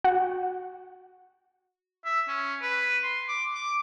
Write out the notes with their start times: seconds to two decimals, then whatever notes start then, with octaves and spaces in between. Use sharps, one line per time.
0.04 F#4
2.05 E5
2.28 C#4
2.62 B4
3.03 C6
3.29 D6
3.55 D6